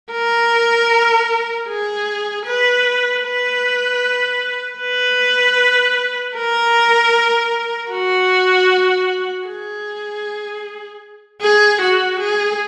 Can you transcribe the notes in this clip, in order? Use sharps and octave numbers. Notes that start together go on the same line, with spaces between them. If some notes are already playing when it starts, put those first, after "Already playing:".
A#4
G#4
B4
B4
B4
A#4
F#4
G#4
G#4
F#4
G#4